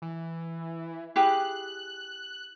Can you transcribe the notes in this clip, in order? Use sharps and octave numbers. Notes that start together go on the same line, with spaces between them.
E3
E4 G4 G#4 F#6